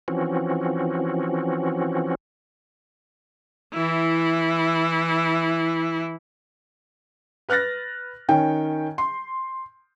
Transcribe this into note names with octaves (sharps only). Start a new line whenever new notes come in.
E3 F3 C4 C#4 F#4
E3 E4
B4 F6 F#6 A6 A#6
D#3 C#4 G5
C6